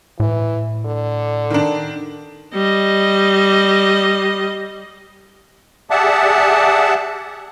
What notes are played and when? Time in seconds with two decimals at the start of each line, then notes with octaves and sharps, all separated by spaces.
0.20 A2 E3
0.86 D3
1.50 D#3 D4
2.54 G3 D#5
5.90 G4 G#4 D5 E5 F#5 A5